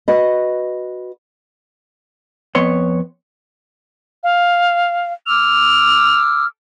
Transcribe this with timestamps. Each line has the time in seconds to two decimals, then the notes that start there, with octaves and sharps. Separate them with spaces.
0.08 F#4 B4 D#5
2.55 F2 B3 C#5 C6
4.23 F5
5.26 D6 E6 F6 F7